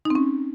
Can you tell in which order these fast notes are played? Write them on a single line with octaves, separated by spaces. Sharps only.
D#4 C4 C#4